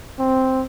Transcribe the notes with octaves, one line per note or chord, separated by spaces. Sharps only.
C4